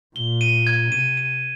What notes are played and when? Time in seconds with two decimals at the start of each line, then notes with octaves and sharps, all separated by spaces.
0.16 A#2 G7
0.41 D#7
0.67 G#6
0.92 C3 D#7
1.17 D#7